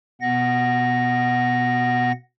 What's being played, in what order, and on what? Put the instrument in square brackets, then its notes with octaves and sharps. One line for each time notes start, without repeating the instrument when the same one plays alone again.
[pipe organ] B2 B3 F#5 A#6